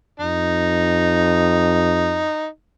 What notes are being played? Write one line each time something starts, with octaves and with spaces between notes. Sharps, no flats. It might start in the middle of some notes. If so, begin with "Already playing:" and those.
F2 D#4